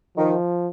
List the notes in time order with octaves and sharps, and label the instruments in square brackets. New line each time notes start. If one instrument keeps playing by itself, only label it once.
[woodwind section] D#3 [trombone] F3